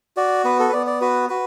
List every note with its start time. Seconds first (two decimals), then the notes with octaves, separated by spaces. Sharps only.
0.17 F#4 D5
0.44 B3 B4
0.59 A4
0.69 B4
0.73 B3 D5
0.87 D5
1.01 F#4 B4
1.29 F#4 B4